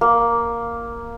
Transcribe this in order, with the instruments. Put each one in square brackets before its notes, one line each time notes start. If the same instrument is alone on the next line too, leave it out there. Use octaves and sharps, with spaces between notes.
[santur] A#3